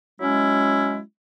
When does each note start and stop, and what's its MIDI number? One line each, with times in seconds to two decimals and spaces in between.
0.20 0.99 54
0.20 0.99 56
0.20 0.99 61
0.20 0.99 64